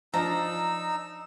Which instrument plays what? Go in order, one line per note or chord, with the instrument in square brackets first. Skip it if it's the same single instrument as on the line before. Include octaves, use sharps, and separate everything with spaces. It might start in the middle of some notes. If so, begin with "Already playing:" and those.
[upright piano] F3 D4 [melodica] D#4 E6 [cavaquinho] A#5